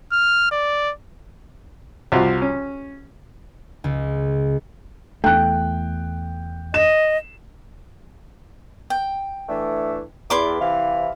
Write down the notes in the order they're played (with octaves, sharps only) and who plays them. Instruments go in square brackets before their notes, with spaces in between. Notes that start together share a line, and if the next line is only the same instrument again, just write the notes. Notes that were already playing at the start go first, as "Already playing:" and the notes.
[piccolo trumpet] F6
D5
[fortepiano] C2 F4 F#4
C#4
[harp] C#2
[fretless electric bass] E2 A3 [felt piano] G5 F#6
[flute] D#5 [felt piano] E7
[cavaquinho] G5
[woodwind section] E3 A3 D4
[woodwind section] E2 [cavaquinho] E4 C6 D6
[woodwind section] C3 E3 F5